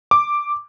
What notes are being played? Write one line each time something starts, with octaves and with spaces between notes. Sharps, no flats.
D6